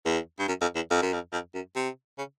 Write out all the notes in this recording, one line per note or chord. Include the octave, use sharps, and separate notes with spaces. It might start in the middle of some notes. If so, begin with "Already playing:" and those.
E2
G2
F#2
F2
E2
F2
F#2
F2
F2
F#2
C3
C#3